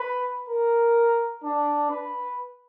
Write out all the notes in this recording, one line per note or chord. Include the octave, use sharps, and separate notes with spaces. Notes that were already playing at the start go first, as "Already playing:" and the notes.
Already playing: B4
A#4
D4
B4